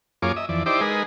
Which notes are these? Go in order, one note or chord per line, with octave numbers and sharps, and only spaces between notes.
F#2 A#3 F4 G#4 C#5 D6
D#5 E5
F2 E3 D5
D#4 E4 G4 C5 D5 D6
G#3 D#4 G#4 A#4 B4